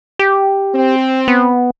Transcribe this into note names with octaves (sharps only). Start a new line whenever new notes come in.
G4
C4
B3